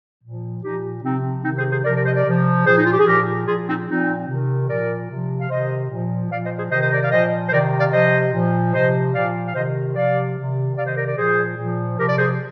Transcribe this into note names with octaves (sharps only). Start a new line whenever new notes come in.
A#2 F3
A#2 F3 D#4 G4
C3 F3 C4 D#4
C3 D#3 C4 D#4
G#4 C5
G#4 C5
C3 F3 A#4 D5
A#4 D5
C5 D#5
A#4 D5
C3 F3
A#2 F3 G#4 C5
D#4
F4
G4
G#4
A#2 F3 G4 A#4
A#2 F3 F4 G#4
C4 D#4
A#2 F3 C4 D#4
C3 D#3
A#2 F3 A#4 D5
C3 F3
F5
C3 D#3 C5 D#5
A#2 F3
A#2 F3 D5 F5
C5 D#5
G#4 C5
C3 D#3 C5 D#5
C5 D#5
A#4 D5
D5 F5
A#2 F3 C5 D#5
C5
C3 D#3 A#4 D5
D5 F5
C3 F3 C5 D#5
A#2 F3
C3 F3 C5 D#5
A#2 F3 D5 F5
F5
C3 D#3 C5 D#5
C3 F3 D5 F5
C3 D#3
C3 D#3 D5 F5
C5 D#5
A#4 D5
A#4 D5
A#2 F3 G#4 C5
A#2 F3
C3 F3 G4 A#4
D5
G#4 C5